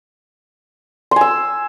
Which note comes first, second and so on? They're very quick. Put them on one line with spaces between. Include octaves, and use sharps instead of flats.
C6 G#5 E6